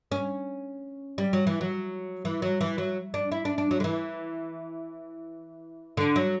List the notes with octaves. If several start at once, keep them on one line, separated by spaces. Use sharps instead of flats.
C#4
G3
F#3
E3
F#3
E3
F#3
E3
F#3
D4
E4
D4
D4
F#3
D3
E3
D3
F#3